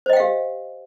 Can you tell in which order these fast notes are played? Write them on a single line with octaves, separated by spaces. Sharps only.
C5 D#5 G5 F5 G4